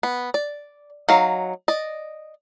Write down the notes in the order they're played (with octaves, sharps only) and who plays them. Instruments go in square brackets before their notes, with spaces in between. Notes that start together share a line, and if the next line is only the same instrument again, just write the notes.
[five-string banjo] B3
D5
F#3 D#4 F5
D5 D#5